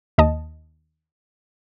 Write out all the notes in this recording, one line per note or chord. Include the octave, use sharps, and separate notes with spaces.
D#2 D#5 A5